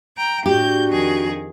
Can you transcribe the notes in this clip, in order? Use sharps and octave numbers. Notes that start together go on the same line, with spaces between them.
G5 A#5
A2 D4 F#4 G4 G6
F2 D#3 G#4